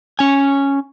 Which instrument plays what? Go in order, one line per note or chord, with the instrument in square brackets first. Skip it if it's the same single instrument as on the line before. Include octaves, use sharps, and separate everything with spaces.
[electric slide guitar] C#4 G#5